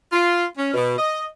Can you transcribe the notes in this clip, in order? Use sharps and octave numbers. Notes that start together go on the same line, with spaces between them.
F4
C#4
B2
D#5